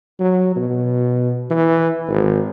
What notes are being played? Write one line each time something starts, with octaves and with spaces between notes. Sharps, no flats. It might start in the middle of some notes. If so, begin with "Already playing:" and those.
F#3
B2
E3
G#1